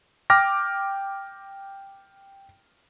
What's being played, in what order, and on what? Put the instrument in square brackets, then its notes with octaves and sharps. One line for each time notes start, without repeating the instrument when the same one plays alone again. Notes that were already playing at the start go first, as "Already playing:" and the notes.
[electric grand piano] G5 D6 F6 A#6